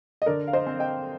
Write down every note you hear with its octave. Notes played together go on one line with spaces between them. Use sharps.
D#5
D3 A#4 D5
F5
C5 D#5
C4
D#5 G5